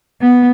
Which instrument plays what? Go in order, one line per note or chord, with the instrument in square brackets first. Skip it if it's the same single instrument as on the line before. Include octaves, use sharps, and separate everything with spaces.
[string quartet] B3